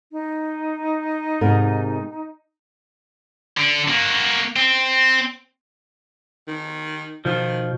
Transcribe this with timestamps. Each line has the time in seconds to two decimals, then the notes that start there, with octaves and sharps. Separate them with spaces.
0.12 D#4
1.41 G#2 C3 A#4
3.57 D3 D4
3.88 A#3 F#4
4.56 C4
6.48 D#3
7.25 B2 D#3 F3